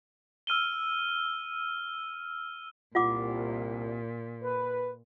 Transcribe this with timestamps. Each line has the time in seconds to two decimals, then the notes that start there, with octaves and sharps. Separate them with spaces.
0.47 E6 F6 D#7 G7
2.95 C2 A#2 F4 F#5 D6
4.42 B4